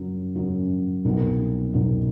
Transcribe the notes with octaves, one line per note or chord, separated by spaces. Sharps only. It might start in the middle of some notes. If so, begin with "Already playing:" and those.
Already playing: F#2 C#3 F#3
F#2 C#3 F#3
C2 B2 F#3 B3 D#4
C2 B2 F#3 B3 D#4